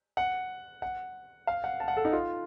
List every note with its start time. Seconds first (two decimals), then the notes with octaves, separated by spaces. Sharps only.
0.17 F#5
0.82 F#5
1.47 F5
1.64 F#5
1.80 A5
1.88 F#5
1.97 A4
2.05 D#4
2.13 F4